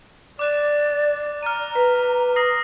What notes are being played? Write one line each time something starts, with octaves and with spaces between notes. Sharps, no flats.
D5 D6 F#6 E7
A#5 F6 D#7
B4
D#6 A#6 C7